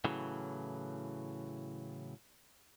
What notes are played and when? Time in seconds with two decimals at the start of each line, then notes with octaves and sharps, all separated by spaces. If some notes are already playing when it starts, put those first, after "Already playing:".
0.04 A2 C#3 E3 F#3